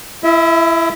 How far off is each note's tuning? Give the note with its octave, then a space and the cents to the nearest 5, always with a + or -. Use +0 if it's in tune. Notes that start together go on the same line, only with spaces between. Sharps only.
E4 +25 E5 -30